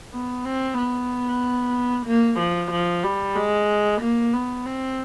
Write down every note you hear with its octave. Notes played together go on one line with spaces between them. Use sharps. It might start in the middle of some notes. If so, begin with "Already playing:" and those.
B3
C4
B3
A#3
F3
F3
G3
G#3
A#3
B3
C4